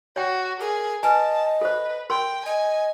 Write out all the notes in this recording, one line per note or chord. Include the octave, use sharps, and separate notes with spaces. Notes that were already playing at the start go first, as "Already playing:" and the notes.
F#4 C#5 G5
G#4 A#4
B4 D#5 G#5 A5
A4 B4 C5
A#4 G5 C6
D#5 G#5